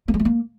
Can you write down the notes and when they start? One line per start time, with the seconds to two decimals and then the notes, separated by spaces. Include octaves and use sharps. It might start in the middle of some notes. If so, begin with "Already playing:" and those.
0.08 A#3
0.14 G#3
0.20 A3
0.25 A#3